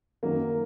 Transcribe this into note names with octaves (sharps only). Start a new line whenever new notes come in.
F#2 D#3 F#3 A#3